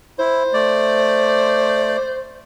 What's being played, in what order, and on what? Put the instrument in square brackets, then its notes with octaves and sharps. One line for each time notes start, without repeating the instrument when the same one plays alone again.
[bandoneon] E4 [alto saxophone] C5
[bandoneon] A3 D5